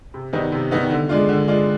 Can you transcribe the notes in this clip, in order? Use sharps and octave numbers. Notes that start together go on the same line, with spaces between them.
C3
D#3 G3 B3 D#4
C3
D#3 G3 B3 D#4
D3
G#3 D4 F4
D3
G#3 D4 F4